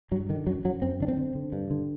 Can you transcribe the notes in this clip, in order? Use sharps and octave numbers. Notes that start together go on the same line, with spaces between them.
G2 F#3
D3 D#3
F#2 F#3
F#2 F#3
F#2 C4
D3 D4
C4
D3
D3
G2
D3